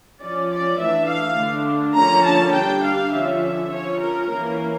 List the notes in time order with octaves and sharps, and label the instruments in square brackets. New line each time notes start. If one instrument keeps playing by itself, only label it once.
[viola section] F3 C#4 D5
D5
E3 A3 D4 E5
F5
D3 A3 D4
D3 F3 A#3 C#4 A#5
A5
G3 D4 G5
F5
D3 F3 C#4 E5
F3 C#4 C#5
A#4
E3 A#3 C#4 A#4